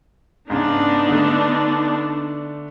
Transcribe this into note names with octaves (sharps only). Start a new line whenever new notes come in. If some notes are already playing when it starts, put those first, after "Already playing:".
G#2 C#3 B3 D4 D#4
D3 A3